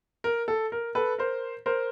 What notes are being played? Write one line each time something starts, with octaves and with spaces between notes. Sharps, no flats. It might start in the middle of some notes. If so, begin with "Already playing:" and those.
A#4
A4
A#4
A4 B4
A#4 C5
A#4 C5